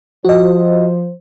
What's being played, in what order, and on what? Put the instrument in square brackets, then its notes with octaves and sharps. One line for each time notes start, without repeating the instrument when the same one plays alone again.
[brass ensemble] F3 C5 [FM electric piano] F#4 D#5